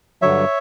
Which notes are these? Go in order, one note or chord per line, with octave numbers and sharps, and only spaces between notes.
G2 D3 F#3 C#5 E5